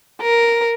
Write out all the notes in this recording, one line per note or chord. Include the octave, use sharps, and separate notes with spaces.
A#4